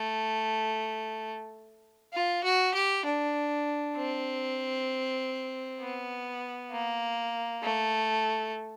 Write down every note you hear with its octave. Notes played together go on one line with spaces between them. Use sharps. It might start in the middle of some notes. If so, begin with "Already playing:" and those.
Already playing: A3
F4
F#4
G4
D4
C4
B3
A#3
A3